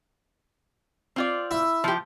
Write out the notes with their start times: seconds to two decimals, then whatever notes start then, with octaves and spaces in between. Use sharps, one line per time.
1.16 C4 F4 D5
1.51 E4
1.84 F3 G4